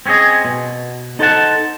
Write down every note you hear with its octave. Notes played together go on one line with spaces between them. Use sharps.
C4 C#4 F4 G#4 D#5
B2
D#4 A4 C5 C#5 F#5 A5